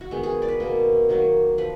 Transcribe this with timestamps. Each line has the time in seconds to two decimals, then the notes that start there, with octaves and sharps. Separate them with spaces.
0.01 F#4
0.11 D#3 G#3 B3 G#4
0.23 G#4
0.42 D5
0.48 B4
0.60 B2 A#3
1.09 D#3 F#3 A#3
1.58 F3 B4